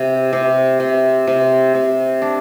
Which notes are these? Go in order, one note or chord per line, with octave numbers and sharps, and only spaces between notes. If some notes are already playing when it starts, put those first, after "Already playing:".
Already playing: C3
C3
C3
C3
C3
D4